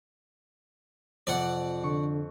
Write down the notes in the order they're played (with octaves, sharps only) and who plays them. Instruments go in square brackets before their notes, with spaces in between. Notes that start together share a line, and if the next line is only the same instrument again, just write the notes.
[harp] F2 C3 [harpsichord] D5 F#5
[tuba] D3 [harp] C#6